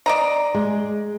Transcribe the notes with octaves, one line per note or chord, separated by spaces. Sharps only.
D5 D#5 A#5
G#3